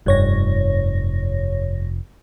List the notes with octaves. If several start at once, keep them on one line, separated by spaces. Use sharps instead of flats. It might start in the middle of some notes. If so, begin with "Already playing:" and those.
F1 G2 C#5 A#6